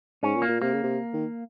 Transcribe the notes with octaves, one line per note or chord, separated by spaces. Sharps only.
G#2 C#4
A#2
A#3
A#2
C3 A#3
C#3
C3
D#3